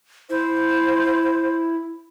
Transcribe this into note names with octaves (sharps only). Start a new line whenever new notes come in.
E4 C5